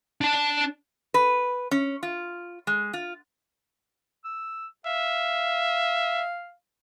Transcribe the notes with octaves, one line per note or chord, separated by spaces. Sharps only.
D4 A5
B4
C#4
F4
G#3
F4
E6
E5 F5